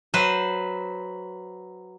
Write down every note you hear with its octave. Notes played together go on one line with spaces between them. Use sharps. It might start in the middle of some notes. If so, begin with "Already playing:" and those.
F#3 B4 C5